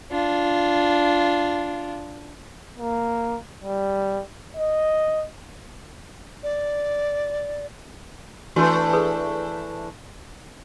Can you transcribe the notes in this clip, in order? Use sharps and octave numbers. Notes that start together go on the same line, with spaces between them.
D4 F4
A#3
G3
D#5
D5
E3 A3 D4 F#4 B4 C6
G#4 A4 B4